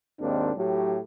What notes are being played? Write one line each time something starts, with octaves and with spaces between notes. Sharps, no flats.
G#1 D#2 C4 D4
A2 F#3 G4